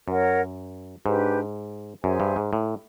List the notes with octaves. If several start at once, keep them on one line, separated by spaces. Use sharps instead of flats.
F#2 A#4 C#5 F#5
G#2 D4 G4 B4
F#2 G#4 C5 E5 G#5
G2
G#2
A2